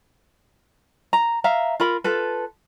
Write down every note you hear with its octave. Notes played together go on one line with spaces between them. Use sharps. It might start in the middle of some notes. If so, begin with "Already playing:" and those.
A#5
E5 F5 A#5
F4 A#4 B5
F4 A4 B4